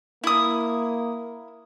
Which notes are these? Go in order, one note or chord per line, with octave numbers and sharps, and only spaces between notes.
A#3 E4 D#6